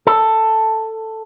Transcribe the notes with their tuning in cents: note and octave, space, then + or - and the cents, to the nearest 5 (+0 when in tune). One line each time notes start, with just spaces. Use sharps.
A4 +10